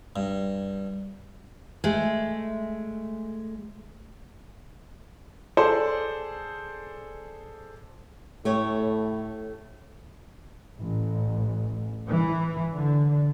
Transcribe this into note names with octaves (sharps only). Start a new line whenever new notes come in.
G2
G#3 A3
G#4 A4 C5 D5
A2 A3 G4 C#5
A1
E3
D3